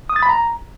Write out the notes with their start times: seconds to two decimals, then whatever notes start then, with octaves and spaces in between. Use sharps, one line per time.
0.09 D#6
0.16 A6
0.23 B5
0.29 A#5